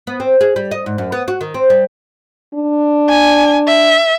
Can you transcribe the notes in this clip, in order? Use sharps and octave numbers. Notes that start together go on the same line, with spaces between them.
B3
C4
G#4
G3
D#5
G#2
F#2
B3
F#4
D#3
C4
G3
D4
G#5
E5